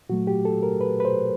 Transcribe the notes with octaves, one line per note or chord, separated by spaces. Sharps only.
A#2 F#3 A3 F#4
G4
A4
A#4
B4
B4
C5